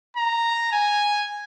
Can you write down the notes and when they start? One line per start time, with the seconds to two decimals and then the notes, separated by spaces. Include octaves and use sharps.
0.17 A#5
0.72 G#5